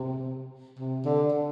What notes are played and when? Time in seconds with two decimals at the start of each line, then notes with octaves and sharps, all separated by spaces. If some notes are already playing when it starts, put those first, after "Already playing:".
Already playing: C3
0.79 C3
1.05 D3
1.31 D3